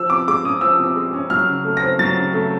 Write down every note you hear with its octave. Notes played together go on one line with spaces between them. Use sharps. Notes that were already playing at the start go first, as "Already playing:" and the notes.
Already playing: F3 E6
C3 D6
G#3 D6
C#4 D#6
F3 E6
C3
G#3
C#4
F#3 F6
C#3
A3
A#6
C4
F#3 A6
C#3
A3